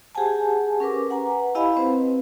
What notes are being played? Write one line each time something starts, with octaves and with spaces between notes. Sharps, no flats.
G4 G#4 C5 F#5 G#5 A5
C#4 A#4 B4 D6
B4 F#5 G#5 A#5
E4 G4 D#5 F5 G#5 B5
C4 B4 C5